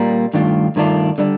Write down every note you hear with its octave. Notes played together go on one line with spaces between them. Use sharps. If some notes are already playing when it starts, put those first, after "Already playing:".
Already playing: A#2 G3 A#3
G2 D#3 A3 D4 F4
G2 D#3 A3 D4 F4
D3 G3 D4